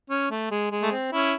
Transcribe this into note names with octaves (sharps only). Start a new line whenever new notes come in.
C#4
A3
G#3
G#3
A3
C4
C#4 E4